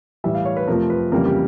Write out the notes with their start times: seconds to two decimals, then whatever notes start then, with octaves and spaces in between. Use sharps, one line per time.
0.24 A2 E3 G3 E5
0.35 F5
0.45 C#5
0.57 B4
0.68 F2 C3 F3 A3 A#4
0.90 B4
1.12 F2 C#3 E3 G3 A#3 A#4
1.25 G4